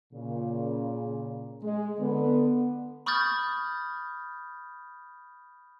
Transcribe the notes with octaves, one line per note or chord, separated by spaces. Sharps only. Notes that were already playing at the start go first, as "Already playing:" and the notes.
A#2 C#3
G#3
D3 B3
B5 C#6 D#6 F6 G6 A6